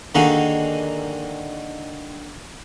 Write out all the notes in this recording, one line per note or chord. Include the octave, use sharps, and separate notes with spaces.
D3 D#3 A#3 F#4 G#4